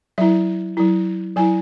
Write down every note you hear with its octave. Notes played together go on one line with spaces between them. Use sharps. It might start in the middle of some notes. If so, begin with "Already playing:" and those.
F#3 E4 E5
F#3 E4
F#3 E4 G#5